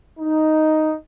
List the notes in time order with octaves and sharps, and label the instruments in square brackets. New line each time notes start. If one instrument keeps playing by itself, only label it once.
[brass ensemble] D#4